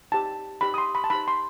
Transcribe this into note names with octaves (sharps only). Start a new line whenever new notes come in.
D#4 G4 C5 A5
D#4 G4 C5 B5
D#6
C6
B5
A5
D#4 G4 C5 B5
C6